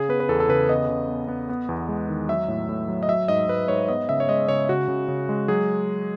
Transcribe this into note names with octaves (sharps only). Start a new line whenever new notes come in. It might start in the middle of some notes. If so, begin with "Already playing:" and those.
Already playing: C#3 G#4
B3 B4
B4
E2 A4
A4
C#3 B4
B3 D#5
C#3
B3
B3
B3
E2
G#3
D#3
F#3 E5
A2
A2
F#3
D#5
F#3 E5
G#2 D#5
G#2 B4
G#2 C#5
B3 D#5
C#3 E5
C#5
G#3 D#5
C#3 C#5
C#3 F#4
C#3
C#3
G#3
F#3 G#4